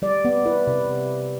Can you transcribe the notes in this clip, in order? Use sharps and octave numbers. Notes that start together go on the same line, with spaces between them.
G3 D5
B3
E4 B4
C3